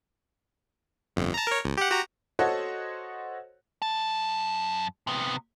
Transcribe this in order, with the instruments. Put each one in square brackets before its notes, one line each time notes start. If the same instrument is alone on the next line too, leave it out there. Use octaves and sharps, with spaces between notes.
[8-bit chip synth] G1 F2
A5 A#5
A#4 C#5
C#2
G4 F#5
F#4 G4 A#5
[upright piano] F#4 A4 C5 C#5 D#5 F#5
[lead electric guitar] F#2 A5
C3 B3